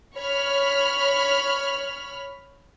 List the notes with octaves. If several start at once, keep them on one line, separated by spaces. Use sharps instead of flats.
C#5 B5 F6